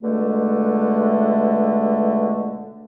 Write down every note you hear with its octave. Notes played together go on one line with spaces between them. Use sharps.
C#2 B2 D3 G#3 A3